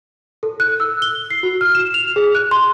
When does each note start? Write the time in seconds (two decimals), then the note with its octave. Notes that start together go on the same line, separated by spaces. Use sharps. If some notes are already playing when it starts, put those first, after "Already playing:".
0.43 A4
0.60 F#6
0.80 E6
1.02 G7
1.30 C7
1.43 F#4
1.61 F6
1.75 E7
1.94 F7
2.16 G#4
2.35 F#6
2.51 C6